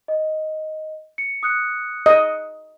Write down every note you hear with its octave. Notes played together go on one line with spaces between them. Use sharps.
D#5
C#7
D#6 F#6 C#7
D#5